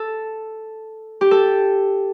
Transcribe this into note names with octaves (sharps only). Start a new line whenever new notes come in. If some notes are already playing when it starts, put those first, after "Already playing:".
Already playing: A4
G4
A4